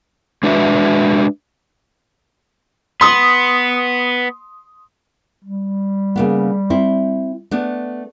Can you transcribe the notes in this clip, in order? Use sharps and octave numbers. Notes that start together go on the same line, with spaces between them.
G#3 D4 F#4 B4 E5
B3 C6 D#6
G3
C#3 A#3 B3
C4 E4
A3 B3 D4